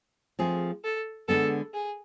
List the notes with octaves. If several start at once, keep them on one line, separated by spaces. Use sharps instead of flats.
F3 A3 C4 G#4
A4
D3 G#3 B3 A4
G#4